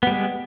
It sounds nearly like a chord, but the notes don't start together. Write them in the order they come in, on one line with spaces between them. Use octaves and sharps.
B3 G3 G#3